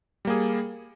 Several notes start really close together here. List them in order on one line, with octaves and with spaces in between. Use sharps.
G3 A#3 G#4